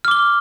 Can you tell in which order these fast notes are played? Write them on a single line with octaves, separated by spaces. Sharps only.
F6 D6 G7